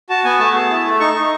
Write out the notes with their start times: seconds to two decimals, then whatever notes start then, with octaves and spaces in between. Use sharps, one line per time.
0.10 F#4 A5
0.24 B3 G#5
0.39 A3 A5
0.54 G#4
0.70 E4
0.84 A3
1.00 D#4 C#6
1.14 D#4